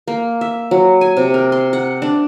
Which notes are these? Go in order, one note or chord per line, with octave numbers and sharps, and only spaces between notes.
A#3
E5
F#3
G#5
C3
A#4
C6
F#5
D4